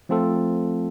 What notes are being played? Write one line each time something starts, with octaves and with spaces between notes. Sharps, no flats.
F3 A3 C4 F4 A4